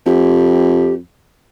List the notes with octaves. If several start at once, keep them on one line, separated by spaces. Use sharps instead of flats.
F2 G4